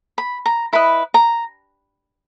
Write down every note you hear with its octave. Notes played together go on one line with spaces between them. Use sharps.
B5
A#5
E4 B4 D#5 B5
A#5